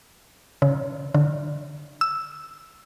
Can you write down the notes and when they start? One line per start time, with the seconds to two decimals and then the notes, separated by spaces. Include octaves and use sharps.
0.62 C#3
1.14 D3
2.01 E6